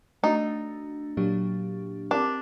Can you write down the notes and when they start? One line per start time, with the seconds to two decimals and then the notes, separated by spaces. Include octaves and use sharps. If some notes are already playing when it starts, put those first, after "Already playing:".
0.23 A3 D4 D#4 F#4
1.17 A#2 F#3 A#3 D4 G4
2.11 C4 D4 E4 G4 A#4